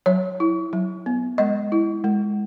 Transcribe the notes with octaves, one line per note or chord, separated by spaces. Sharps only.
F#3 C#5
E4
F#3
B3
G#3 D#5
E4
G#3